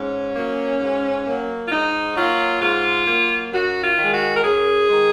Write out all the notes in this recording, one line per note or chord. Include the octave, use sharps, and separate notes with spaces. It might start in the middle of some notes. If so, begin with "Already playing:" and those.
Already playing: G#2 C#4
F#3 A#3
G#2
F#3 A#3
F4
G#2 D#4
F#3 A#3 F4
G#2 F4
F#3 A#3
F#2 F#4
F4
D#3 G#3
F#4
A#4
F#2 G#4
D#3 G#3